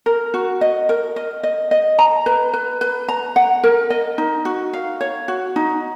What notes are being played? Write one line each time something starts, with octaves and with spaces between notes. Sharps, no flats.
A#4
F#4
D#5
A#4
D#5
D#5
D#5
A#5
B4
B4
B4
A#5
F#5
A#4
D#5
D#4
F#4
F5
C#5
F#4
D#4